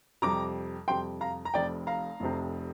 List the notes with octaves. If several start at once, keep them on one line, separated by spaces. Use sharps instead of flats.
F2 C3 G3 A#5 D6
F2 C3 G3 G5 C6
F5 A#5
A#5
F1 F2 C3 D5 G5
F5 A#5
F1 F2 C3